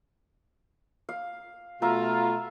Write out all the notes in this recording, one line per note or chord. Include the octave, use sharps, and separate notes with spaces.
F5
B2 A3 F4 E5 A#5